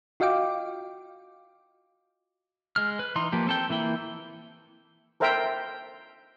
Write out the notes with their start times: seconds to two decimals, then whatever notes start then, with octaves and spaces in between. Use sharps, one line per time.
0.20 F4 F#4 D#5 F5 G5 D6
2.76 G#3 F6
2.99 B4
3.16 E3 D#4 C6
3.32 F3 A#3 G4
3.47 C4 A4 G5
3.70 E3 A#3 E4 G5
5.20 A4 A#4 C5 E5 G5